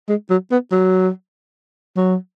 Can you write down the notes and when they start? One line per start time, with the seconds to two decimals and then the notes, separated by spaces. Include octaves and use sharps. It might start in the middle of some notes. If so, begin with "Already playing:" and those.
0.09 G#3
0.30 F#3
0.51 B3
0.71 F#3
1.96 F#3